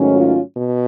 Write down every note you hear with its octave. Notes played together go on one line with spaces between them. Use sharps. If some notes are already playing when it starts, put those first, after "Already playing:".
Already playing: G#2 D#3 F#3 A3 C#4
F4
B2